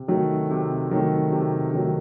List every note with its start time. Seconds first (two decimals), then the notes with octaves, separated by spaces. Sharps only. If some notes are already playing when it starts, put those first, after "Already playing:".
Already playing: C3
0.08 D#3 F#3 A3
0.50 C3
0.91 D#3 F#3 A3
1.32 C3
1.74 D#3 F#3 A3